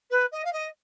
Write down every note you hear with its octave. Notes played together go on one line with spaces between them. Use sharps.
B4
D#5
F5
D#5